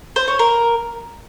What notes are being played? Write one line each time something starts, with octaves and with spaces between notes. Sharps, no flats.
C5
C#5
A#4